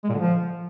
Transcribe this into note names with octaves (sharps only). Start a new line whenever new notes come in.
G#3
A#2
D3
F3